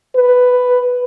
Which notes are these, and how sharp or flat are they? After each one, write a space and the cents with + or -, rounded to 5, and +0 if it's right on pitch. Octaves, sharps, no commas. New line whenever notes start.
B4 +5